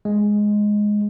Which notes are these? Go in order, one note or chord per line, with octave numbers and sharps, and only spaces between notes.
G#3